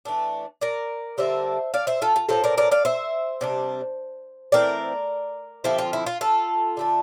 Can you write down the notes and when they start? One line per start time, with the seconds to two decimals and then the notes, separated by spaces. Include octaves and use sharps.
0.05 E3 A3 D4
0.61 A#4 D5
1.18 D3 G3 A#3 D4 C5 E5
1.74 D5 F5
1.87 C5 E5
2.02 F4 A4
2.16 F4
2.29 A2 G3 C4 F4 A4
2.44 A#4 D5
2.58 A#4 D5
2.71 D5 F5
2.85 C5 E5
3.41 C3 G3 D4
4.52 E3 A3 C4 A#4 D5
5.64 D3 F3 C4 E4 G4
5.78 F4
5.93 E4
6.06 F4
6.21 F4 A4
6.77 D3 A3 D4